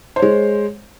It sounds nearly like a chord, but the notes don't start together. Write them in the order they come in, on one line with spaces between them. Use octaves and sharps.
C5 C#5 G#3